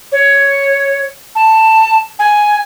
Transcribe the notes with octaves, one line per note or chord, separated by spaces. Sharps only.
C#5
A5
G#5